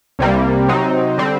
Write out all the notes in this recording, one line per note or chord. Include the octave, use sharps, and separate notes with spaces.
C2 C3 G3 A#3
C3 F#3 C4 D#4
D3 G3 C4